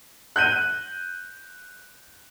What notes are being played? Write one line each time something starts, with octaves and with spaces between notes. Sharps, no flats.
F#6 G6 D#7